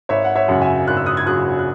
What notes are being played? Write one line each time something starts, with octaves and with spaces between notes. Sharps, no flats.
G#1 C#5 E5
F#5
C#5 E5
F#2 C#3 F#3 F#5
E5 G#5
G#1 F#6
E6
D#6 F#6
G#6
F#2 C#3 F#3 D#6 F#6
F#6